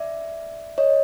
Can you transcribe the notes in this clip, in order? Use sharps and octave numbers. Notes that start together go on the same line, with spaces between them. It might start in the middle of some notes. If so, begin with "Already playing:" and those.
Already playing: D5 E5
C#5 D#5